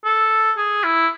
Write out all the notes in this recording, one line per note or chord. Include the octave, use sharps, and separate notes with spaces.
A4
G#4
E4